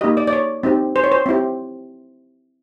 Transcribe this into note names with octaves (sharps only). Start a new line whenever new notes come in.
A#3 D#4 G4 D#5
D5
D5
C#5
C4 D#4 G4
C5
C#5
C5
C4 E4 G4